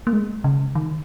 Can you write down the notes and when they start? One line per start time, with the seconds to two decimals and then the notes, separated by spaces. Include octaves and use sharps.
0.07 A#3
0.13 G#3
0.44 C#3
0.75 D#3